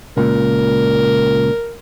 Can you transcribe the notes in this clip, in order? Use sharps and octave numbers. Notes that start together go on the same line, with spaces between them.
C#2 A#2 A#4